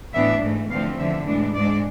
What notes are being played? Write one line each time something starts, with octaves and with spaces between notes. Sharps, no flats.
A2 E3 B3 D4 E5
G#2 E3 A3
E2 D3 F3 A3 C4 F5
E2 D3 F3 E5
A2 E3 G#3 D4
G#2 G#3 D4 D5